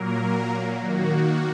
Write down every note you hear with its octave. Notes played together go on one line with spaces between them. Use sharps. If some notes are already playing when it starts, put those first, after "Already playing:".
Already playing: A#2 F#3 A#3 A#4
D#3 A#3 F#4